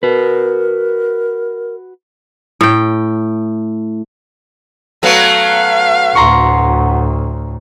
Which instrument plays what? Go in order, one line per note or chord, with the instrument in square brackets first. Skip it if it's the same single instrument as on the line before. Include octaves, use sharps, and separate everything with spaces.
[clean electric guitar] F#4 B4 [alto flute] A#4
[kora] A2 G5
[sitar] F#3 A3 B3 [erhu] F5
[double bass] D2 A2 [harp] A#5 C6 C#6